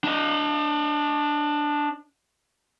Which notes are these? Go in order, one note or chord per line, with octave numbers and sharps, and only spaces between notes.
D4 D#5